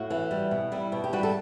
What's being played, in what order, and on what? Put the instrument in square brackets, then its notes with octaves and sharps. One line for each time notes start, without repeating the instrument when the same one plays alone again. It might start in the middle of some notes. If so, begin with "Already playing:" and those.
Already playing: [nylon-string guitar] A2 F#4
E3
G3
B2
G3 E4
B2
G4
G3 F#4
A4